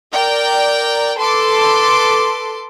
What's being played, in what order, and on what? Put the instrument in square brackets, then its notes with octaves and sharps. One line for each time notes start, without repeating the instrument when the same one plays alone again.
[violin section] A#4 D5 G5
A4 B4 C6 D6